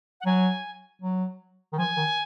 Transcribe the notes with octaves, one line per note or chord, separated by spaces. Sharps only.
F#5
F#3 G#5
F#3
D#3
F3 G#5
D#3